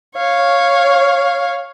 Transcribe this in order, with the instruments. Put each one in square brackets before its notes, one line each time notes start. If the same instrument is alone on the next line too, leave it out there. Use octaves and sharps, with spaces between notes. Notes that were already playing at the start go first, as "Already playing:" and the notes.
[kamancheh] C#5 F5